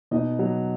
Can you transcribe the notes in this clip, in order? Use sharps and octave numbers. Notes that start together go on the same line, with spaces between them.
B2 D#4 D#5
F#3